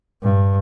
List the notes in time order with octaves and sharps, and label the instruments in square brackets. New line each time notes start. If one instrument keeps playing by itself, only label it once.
[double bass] G2